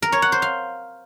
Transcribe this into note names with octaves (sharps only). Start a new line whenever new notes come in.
A#4
C#5
F#5
C5
F5